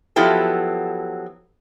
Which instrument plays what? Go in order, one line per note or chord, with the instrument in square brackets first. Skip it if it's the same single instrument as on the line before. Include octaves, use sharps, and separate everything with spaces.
[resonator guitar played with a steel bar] F3 F#3 B3 E4 G4 A4